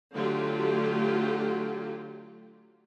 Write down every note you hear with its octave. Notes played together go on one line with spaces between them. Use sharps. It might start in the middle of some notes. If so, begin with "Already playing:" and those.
D3 F#3 A3 F4 G4